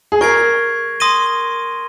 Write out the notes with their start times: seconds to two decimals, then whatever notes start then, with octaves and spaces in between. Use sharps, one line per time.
0.12 G#4
0.21 A#4 C#6 G#6 C7
1.00 C6 D#6 A#6 D#7 G7